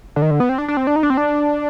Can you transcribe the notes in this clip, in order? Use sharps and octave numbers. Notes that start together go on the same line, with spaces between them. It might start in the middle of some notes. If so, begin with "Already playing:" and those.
D3
D#3
D3
B3
C4
D4
D4
C4
D4
D#4
D4
C4
D4